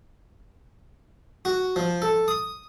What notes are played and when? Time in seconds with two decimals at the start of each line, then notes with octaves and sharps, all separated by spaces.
1.45 F#4
1.76 F3
2.02 A4
2.28 D#6